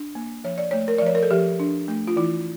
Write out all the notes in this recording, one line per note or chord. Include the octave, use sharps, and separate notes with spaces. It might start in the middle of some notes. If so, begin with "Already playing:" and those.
Already playing: D4
A#3
F3 C#5
D5
A3 C#5
A#4
D5
F3 C#5
A#4
A4
F3 G4
D4
A3
F4
E3 E4